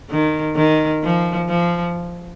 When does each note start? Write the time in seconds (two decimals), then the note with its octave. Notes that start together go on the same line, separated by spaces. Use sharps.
0.11 D#3
0.56 D#3
1.04 F3
1.49 F3